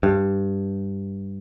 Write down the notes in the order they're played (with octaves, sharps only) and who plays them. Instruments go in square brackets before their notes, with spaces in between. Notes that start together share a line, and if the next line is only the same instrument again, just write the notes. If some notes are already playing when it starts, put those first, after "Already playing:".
[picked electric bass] G2